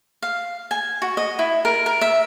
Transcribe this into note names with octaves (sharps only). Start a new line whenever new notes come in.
F5
G#5
F#4
D#5
E4
A#4
A#4
E5